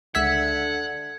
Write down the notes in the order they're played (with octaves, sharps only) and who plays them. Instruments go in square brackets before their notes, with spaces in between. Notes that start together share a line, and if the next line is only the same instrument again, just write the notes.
[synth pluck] C#2 E5 B6 [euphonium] D3 [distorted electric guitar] F#5 [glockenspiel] G#6